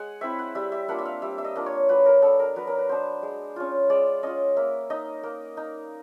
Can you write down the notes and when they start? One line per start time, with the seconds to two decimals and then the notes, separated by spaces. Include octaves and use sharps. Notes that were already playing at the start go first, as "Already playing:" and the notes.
Already playing: G#3 F#5 G#5
0.21 C4 E4 E5
0.39 F#5
0.55 G3 E5
0.72 E5
0.88 A#3 D4 F4 F#5
0.98 E5
1.05 F5
1.22 G3 E5
1.38 E5
1.44 D#5
1.56 A#3 D4 F4
1.66 C#5
1.89 F#3 B4
2.06 A#4
2.22 B3 D4 A4
2.39 A#4
2.56 F#3 B4
2.67 A#4
2.78 B4
2.89 B3 D4 C5
3.23 G#3
3.56 C#4 F4
3.90 G#3 D5
4.23 C#4 F4 D#5
4.56 A#3 E5
4.90 D#4 D#5
5.23 A#3
5.57 D#4